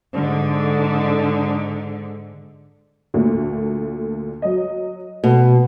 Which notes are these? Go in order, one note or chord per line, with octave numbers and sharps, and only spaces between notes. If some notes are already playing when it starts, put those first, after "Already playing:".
G#2 D3
D2 A#2 D3
F#3 D#5
B2 A3